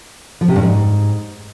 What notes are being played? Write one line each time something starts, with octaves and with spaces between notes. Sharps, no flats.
F3
C3
G2
G#2